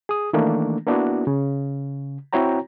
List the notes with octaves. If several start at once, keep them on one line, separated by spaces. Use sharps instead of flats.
G#4 D#6
D#3 E3 A3 A#3 D4
A#3 B3 D4 E4 F#4
C#3
C4 E4 F#4 C#5 G5 A#5